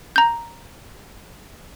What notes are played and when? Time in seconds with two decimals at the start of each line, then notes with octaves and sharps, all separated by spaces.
0.16 A#5 G6